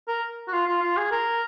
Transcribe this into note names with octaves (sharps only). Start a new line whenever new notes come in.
A#4
F#4
F4
F4
F4
G#4
A#4